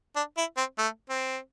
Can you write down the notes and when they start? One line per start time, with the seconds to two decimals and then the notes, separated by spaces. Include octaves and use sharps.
0.16 D4
0.37 E4
0.57 C4
0.78 A3
1.10 C4